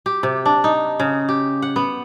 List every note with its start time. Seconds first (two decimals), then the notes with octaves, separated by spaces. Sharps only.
0.06 G4
0.23 C3
0.46 D4
0.64 D#4
1.00 C#3
1.29 G4
1.62 F#5
1.76 B3